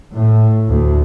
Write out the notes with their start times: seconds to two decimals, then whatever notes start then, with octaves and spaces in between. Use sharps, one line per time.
0.14 A2
0.67 D2